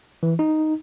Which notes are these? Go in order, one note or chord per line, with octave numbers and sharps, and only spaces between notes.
E3
D#4